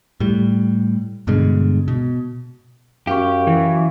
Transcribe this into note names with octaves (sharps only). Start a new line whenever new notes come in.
A2 G3
G2 B2 D3 G#3
B2
F#2 G4 F5 C#6
E3